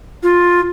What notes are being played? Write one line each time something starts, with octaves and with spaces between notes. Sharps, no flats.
F4